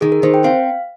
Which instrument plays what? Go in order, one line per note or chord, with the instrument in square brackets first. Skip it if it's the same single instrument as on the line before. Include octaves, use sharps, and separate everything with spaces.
[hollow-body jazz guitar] D#3 [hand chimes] G#4
[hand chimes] A#4
[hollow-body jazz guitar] D#3 [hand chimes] C5
[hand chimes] G5
[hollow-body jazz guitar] C4 [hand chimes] F5